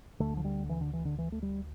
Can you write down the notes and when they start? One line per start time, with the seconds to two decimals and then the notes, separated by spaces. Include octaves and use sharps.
0.20 D2 D3 A3
0.37 F3
0.44 G3
0.69 E3
0.81 D3
0.93 E3
1.05 D3
1.18 E3
1.32 A3
1.42 G3